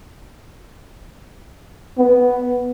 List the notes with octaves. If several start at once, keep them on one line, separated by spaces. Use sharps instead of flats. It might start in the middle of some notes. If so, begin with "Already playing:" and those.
B3